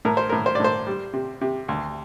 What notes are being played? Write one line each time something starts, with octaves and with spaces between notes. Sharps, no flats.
A2 A#4
C5
A2 A#4
C5
D5
A2 C5
G3
C3
C3
D2